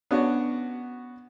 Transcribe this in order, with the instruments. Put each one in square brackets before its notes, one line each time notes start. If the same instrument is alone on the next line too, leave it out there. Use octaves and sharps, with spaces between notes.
[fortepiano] B3 C#4 D4 F#4